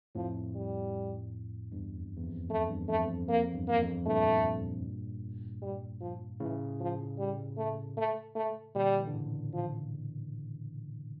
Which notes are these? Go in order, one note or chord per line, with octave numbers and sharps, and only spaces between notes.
F2 A2 F3
G3
E2 G2
F2
E2
F2
F2 A3
E2 G2
F2 A3
F2
F2 A#3
E2 G2
A#3
F2
G2 A#2 A3
G3
F3
A2 C#3 E3
F3
G3
A3
A3
A3
A#2 D3 G3
E3
D3
A2 C#3
F3